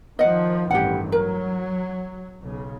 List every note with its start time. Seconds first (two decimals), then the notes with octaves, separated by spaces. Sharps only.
0.19 D#3 F3 D#5 F#5
0.71 A1 G2 D#3 G4 F#5
1.12 F#3 A#4
2.41 B1 C#3